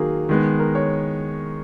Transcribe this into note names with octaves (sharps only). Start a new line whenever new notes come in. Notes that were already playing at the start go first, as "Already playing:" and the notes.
Already playing: D#3 F#3 A#3 G#4
D#3 G#3 B3
A#4
C#5